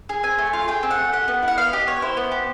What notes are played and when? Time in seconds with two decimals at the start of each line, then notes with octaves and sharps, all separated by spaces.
0.09 G#4
0.23 C4 G#5
0.38 A3
0.53 F4
0.68 G#4 G5
0.83 C4
0.91 F#5
0.98 A3
1.12 G4 F#5
1.28 B3
1.43 E4
1.48 F#5
1.58 B3 F5
1.73 G4 D#5
1.87 B3 C#5
2.02 E4 C5
2.17 B3
2.32 G4